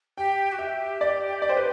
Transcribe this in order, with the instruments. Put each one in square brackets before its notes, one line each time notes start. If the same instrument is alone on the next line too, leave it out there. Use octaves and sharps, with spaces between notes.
[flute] G4 [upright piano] G5
[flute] F#4
[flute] G4 [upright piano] E5
[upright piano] D5
D5
C5
B4